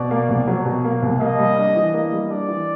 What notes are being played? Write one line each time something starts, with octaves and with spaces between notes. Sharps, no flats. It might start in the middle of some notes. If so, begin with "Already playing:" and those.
Already playing: B2 D5
A#3
C2
F#3
B2
A#3
C2
A#3 D#5
G3
D4
E3
A#3
G3
D4 D5
E3